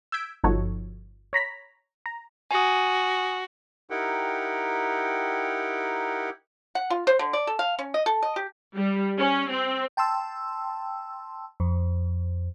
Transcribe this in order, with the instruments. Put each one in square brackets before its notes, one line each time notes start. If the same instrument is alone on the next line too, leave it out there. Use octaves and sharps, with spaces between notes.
[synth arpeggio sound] E6 G6 G#6 B6 D7
G1 F3 D#4 F#4 A4 C#5
C#5 A#5 B5 B6
A#5
[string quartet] F#4 [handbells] G#5 D#6
[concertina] D#4 E4 G4 A#4 F#5 G5
[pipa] F#5
F4
C5
D3
D5
A4
F5
C#4
D#5
A4
D#5
G4
[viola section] G3
C#4
C4
[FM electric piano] G5 A5 C6 E6
F2